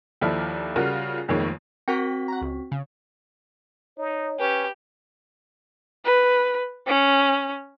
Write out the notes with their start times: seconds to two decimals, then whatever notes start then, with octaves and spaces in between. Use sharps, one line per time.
0.21 D#2 F3 E4 A4 D5 F6
0.76 C#3 G3 F4 F#4 A#4
1.28 F1 F2 D#3 G#3 A#3 C#5
1.88 C4 F#4 A#4 F#5 G5 B6
2.28 F#5 A#5
2.41 C#2
2.72 C#3
3.97 D#4 C#5
4.39 C#4 G4 B4
6.05 B4
6.87 C#4